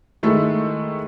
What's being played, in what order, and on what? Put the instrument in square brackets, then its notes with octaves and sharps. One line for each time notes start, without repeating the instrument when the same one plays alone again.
[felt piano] D#3 G#3 A3 E4 A4